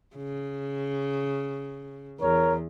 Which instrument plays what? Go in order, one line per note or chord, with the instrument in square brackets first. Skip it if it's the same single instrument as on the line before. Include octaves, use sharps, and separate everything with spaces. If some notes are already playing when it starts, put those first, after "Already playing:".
[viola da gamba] C#3
[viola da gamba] E2 [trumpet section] A#4 C#5